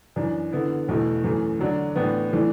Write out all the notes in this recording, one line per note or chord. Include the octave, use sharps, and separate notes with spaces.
F#2 E3 D4
D3 B3 E4
E2 B2 A3 E4
F#2 E3 A3
D3 F#3 D4
A2 E3 B3 D4
E3 A3 D4